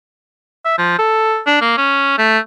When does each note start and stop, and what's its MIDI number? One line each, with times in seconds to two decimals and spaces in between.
0.65 0.75 76
0.78 0.95 53
0.99 1.40 69
1.46 1.57 62
1.61 1.77 58
1.77 2.15 61
2.18 2.38 57